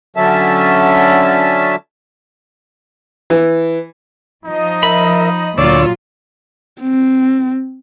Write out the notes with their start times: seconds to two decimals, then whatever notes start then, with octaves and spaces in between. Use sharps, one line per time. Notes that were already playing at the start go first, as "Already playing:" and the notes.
0.16 D3 F#3 C#4 E5 A5
3.30 E3
4.45 F3 D#4 D#5
4.83 A#4 E5 B5
5.58 D2 A#2 F#3 F4 C#5 D5 E6
6.81 C4